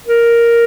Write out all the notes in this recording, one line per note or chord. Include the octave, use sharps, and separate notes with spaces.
A#4